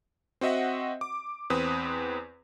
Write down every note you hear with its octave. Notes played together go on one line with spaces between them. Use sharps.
C4 F#4 D#5 E5 F#5
D6
E2 C4 B4 D#6